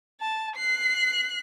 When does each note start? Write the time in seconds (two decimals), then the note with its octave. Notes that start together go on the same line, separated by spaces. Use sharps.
0.21 A5
0.56 F#6 C7